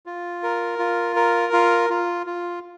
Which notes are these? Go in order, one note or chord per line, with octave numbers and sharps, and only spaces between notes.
F4
A#4
F4
A#4
F4
F4
F4